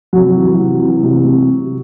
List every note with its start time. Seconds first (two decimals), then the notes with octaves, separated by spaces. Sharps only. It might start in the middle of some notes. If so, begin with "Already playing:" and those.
0.13 C3 F#3
0.36 E3
0.59 C3
0.81 E3
1.03 C3
1.24 C3